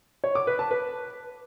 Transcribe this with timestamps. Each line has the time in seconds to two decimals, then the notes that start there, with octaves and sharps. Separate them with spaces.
0.24 C#5
0.35 D6
0.47 B4
0.59 A5
0.71 B4